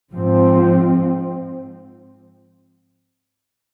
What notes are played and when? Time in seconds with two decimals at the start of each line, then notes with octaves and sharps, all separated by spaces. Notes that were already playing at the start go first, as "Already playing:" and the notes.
0.11 G#2 F3 C4